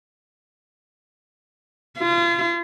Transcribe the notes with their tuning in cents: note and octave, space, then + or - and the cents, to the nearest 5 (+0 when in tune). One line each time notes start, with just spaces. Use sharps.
F4 -35